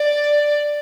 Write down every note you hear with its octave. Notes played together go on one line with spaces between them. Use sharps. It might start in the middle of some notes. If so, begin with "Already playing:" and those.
Already playing: D5